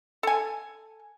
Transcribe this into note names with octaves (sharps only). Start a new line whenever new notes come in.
A4 G#5